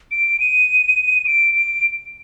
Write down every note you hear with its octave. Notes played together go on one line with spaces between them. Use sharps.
D7
D#7
D7
D7